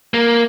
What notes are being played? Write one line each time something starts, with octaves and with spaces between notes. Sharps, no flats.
A#3